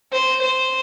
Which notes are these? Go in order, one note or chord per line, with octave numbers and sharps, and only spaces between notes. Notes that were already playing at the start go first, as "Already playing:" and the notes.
C5
C5